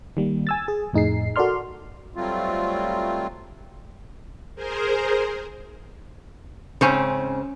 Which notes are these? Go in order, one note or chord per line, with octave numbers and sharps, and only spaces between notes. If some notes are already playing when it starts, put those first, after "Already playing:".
D#3 G3 A#3
G#5 E6 A6
G#4
F2 A2 D#4 G#4 C7
F#4 A4 A#4 D5 C6 F6
F#3 G3 A3 C4 F4
G#4 A#4 C5
G#2 C#3 C4 C#4 C5 C#5